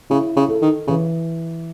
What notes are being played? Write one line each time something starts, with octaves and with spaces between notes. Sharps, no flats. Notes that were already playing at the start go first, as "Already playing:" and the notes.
C#3 E4
C#3
A4
D#3
C#3 E3